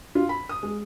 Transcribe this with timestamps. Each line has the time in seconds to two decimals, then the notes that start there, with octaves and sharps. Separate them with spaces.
0.15 F4
0.29 B5
0.49 D#6
0.63 G#3